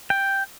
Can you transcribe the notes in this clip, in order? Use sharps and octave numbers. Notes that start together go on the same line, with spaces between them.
G5